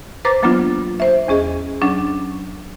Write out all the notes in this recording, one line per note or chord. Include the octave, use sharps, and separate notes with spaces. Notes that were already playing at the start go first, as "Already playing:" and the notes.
B4 C5 A#5 D6 A6 A#6
E3 F#3 A#3 B3 D4 F4
C5 E5
E2 C#4 G#4 D#5
F#3 C#4 D4